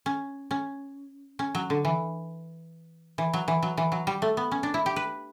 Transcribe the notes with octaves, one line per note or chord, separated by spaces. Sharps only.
C#4
C#4
C#4
F#3
D3
E3
E3
F#3
E3
F#3
E3
F#3
G3
A3
B3
C#4
D4
E4
G4
B4